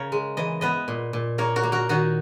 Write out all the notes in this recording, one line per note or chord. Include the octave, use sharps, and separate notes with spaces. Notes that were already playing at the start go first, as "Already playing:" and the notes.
Already playing: C#3 A#4 C#5
G#3
E3 D#5
B3 B4 D#5
A#2
A#2
A#3 A#4 C#5
F#4 A#4
A#3
F#4 A#4
D#3 D#4 F#4